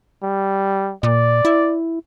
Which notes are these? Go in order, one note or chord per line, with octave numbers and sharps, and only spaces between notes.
G3
A#2 D5
E4